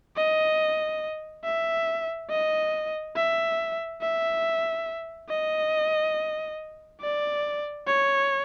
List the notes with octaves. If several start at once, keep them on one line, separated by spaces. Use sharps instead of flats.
D#5
E5
D#5
E5
E5
D#5
D5
C#5